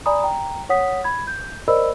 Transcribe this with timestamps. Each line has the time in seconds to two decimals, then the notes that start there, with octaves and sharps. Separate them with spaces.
0.06 D5 G#5 A#5 B5 D#6
0.23 G5 A#5
0.70 C#5 F#5 D#6 B6
1.04 B5 G#6
1.27 G6
1.68 A#4 C5 D5 D#5 B5 E6